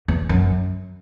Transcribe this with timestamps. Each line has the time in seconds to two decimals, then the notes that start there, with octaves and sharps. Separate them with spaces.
0.08 E2
0.29 F#2